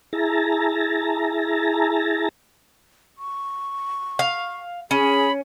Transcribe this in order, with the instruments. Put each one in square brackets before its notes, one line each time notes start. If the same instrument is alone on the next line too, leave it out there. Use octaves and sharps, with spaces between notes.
[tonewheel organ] E4 G#4 A5 A#5
[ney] C#6
[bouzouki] F5
[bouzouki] C#4 [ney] G#4 [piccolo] B5